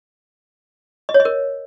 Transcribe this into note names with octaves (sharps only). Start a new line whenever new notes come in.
D#5
C#5
D#5
A#4